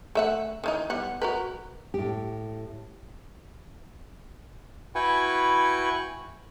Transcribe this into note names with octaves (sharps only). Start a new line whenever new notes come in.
A3 E5 F#5
D#3 E3 D#4
G3 B3 F#5
F#4 A#4 B4
A2 G4
E4 F#4 B4 G5 G#5 C#6